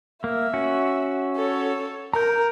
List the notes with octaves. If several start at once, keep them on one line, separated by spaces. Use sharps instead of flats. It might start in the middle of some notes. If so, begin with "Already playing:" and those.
A#3 E5
C#4 F#4
A4 C#5
A#4 A#5 G6